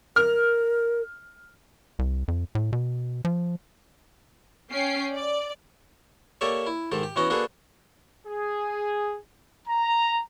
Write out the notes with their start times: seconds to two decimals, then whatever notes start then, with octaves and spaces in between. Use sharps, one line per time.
0.16 A#4 F6
1.99 C2
2.28 F2
2.55 A2
2.73 B2
3.25 F3
4.71 C#4 G5 C7
5.14 D5
6.41 A#3 G4 A4 C#5 D5 E5
6.66 E4
6.92 G#2 D#3 G4 A4
7.03 G4
7.16 E3 B3 C#4 F#4 D#5
7.30 A#3 D4 F#4 G#4 A4 B4
8.27 G#4
9.68 A#5